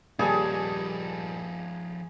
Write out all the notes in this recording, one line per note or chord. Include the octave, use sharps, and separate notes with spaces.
D#1 F3 G3 D#4 G#4 G#5 A5